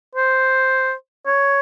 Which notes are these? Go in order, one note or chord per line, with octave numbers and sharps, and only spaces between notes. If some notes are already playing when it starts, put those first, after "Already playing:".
C5
C#5